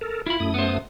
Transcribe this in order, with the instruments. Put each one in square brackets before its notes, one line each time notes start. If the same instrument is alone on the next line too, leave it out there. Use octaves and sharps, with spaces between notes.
[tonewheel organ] A4 A#4
[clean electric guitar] E4 B5 [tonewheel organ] F4
[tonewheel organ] F#2 A3 D#6
[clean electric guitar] B3 C5